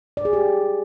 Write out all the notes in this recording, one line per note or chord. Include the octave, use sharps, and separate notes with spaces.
D5
G#4
G4